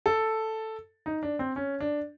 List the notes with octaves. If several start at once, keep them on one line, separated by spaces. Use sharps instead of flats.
A4
D#4
D4
C4
C#4
D4